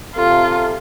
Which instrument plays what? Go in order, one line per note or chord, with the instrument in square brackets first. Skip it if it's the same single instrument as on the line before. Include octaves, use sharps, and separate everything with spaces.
[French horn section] C3 A4 [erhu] F4